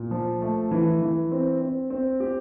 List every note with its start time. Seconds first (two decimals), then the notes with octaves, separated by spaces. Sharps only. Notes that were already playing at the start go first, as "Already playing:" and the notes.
Already playing: A#2
0.11 F3
0.42 A3
0.71 E3
1.02 E3
1.32 C4
1.61 C4
1.90 C4
2.20 G4